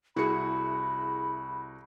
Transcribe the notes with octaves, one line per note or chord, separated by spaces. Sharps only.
C2 E4 F#4 G#4 B5 C#7